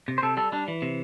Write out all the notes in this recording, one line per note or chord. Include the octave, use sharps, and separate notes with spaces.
C3
C5
C3 A4
G3 A4
G3 D4
E3
C3